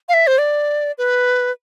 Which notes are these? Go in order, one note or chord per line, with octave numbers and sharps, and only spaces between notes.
F5
E5
C5
D5
B4